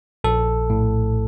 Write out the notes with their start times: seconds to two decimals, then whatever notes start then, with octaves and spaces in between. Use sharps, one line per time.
0.24 A#1 A4
0.70 A2